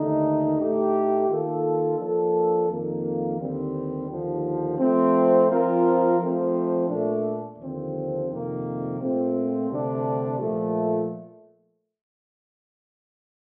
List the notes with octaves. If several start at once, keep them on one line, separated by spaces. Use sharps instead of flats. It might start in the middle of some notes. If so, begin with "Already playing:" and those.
Already playing: D#2 D3 A3 D#4
A2 A3 D#4 G4
D#3 A#3 F4 A4
F3 A#3 D4 A4
F2 D#3 A#3
D#2 D3 G3 C4
D#2 D3 F3
F3 A3 C4
F3 C4 F4 A#4
F3 A3 C4
A#2 A3 D4
D#2 D3 F3 C4
F2 C3 D#3 A#3
A#2 A3 C4 F4
D2 C3 G3 D4
A#2 F3 A3